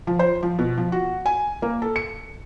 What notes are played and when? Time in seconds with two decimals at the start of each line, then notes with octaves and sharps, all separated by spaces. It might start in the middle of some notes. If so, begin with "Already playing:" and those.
0.07 F3
0.19 C5
0.43 F3
0.59 B2
0.78 F3
0.92 F#4
1.26 G#5
1.62 A#3
1.82 A4
1.96 C#7